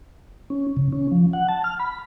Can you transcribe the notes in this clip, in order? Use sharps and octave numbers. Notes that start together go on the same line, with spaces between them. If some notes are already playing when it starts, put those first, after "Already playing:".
C#4
C#3
C#4
F3
F#5
A5
F6
B5